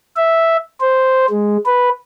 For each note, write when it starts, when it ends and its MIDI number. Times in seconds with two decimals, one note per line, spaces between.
0.17 0.57 76
0.80 1.26 72
1.30 1.57 56
1.66 1.89 71